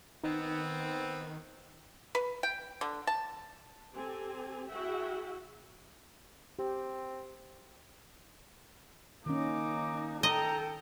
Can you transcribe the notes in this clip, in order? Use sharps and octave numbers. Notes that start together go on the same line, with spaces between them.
D#3 B3 C4 D#4
B4
G5
D3
A5
C4 G4 A4 G#5
E4 F#4 G#4 E5 F#5 G5
C4 G4
D#3 A#3 C#4 D#4 D6
A4 D#5 G5 A#5